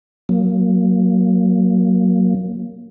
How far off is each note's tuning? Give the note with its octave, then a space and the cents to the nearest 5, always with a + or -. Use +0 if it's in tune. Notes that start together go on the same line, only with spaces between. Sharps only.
F#3 +0 A#3 +0